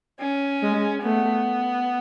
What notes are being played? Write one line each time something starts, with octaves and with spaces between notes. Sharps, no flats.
C#4
G#3
A3 B3